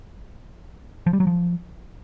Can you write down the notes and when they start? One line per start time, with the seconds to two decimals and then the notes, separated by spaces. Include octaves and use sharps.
1.06 F3
1.13 G3
1.20 F#3
1.27 F3